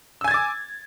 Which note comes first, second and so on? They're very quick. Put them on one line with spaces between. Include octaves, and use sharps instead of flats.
E6 G#5 G#6 A6 D6